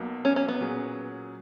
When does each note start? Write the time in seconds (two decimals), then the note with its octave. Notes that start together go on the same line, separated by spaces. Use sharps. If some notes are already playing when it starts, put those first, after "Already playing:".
Already playing: B1 B2 A#3
0.25 C#4
0.36 C#4
0.48 B3
0.61 A#2 F#3 C#4 G#4